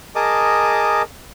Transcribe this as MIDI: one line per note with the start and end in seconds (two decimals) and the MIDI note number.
0.15 1.02 68
0.15 1.02 70
0.15 1.02 75
0.15 1.02 81
0.15 1.02 86
0.15 1.02 87